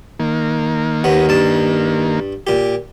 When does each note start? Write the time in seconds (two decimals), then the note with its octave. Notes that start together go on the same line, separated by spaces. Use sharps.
0.20 D#3 A#3
1.04 D#2 B3
1.29 G2 A5
2.47 A#2 G4